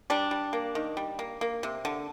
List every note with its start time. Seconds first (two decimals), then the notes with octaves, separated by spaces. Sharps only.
0.10 G3 D4
0.31 G3
0.53 A#3
0.75 D#3
0.97 G3
1.19 A#3
1.41 A#3
1.63 C3
1.85 D3